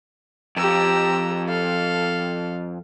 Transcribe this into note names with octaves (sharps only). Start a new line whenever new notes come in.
F2 G4 A#5 E6
A4 F5